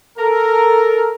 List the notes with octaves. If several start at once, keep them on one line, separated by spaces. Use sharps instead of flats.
A4 A#4